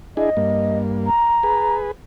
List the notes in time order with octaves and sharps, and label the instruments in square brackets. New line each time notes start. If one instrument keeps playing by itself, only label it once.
[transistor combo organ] D4 E4 G#4 [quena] D#5
[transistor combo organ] G2 A#3
[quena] A#5
[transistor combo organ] G#4 B4